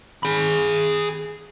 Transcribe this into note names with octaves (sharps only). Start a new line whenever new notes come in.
G#4 B5